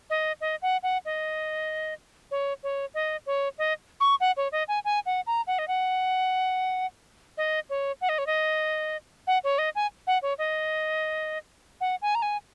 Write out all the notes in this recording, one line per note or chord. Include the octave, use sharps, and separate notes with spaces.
D#5
D#5
F#5
F#5
D#5
C#5
C#5
D#5
C#5
D#5
C#6
F#5
C#5
D#5
G#5
G#5
F#5
A#5
F#5
D#5
F#5
D#5
C#5
F#5
D#5
C#5
D#5
F#5
C#5
D#5
G#5
F#5
C#5
D#5
F#5
G#5
A#5
G#5